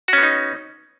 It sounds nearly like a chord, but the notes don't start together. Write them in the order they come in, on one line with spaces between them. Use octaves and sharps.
F#4 C#4 B3 D#4